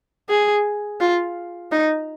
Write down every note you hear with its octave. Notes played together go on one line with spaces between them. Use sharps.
G#4
F4
D#4